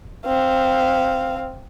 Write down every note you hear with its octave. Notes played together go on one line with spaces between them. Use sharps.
C4 F5